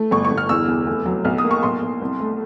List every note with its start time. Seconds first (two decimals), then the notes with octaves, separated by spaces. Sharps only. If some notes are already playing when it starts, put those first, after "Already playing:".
Already playing: A3
0.11 G1 C#6
0.25 C#6
0.31 G1
0.38 F6
0.49 E2 E6
0.68 E2
0.87 F1
1.06 F#3
1.25 B1 F6
1.38 D#6
1.44 A#3
1.51 C#6
1.63 B1 C6
1.82 B1
2.01 C2
2.20 A3